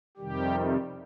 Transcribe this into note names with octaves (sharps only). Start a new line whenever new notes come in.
F2 C3 D#3 G3 G4